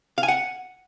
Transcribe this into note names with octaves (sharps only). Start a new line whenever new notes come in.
F5
G#5
F#5